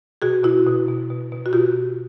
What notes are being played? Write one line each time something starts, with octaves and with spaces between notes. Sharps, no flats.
B2 F#4 G#4
B2 E4 F#4
B2
B2
B2
B2
F#4
B2 F4 G4